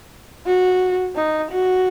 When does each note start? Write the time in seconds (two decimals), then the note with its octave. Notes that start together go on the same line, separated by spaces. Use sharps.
0.46 F#4
1.16 D#4
1.51 F#4